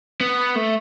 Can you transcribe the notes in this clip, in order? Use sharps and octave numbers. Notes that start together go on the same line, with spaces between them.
B3
A3